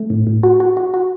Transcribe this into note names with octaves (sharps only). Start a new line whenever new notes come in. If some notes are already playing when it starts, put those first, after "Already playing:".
Already playing: A3
A2
A2
F#4
F#4
F#4
F#4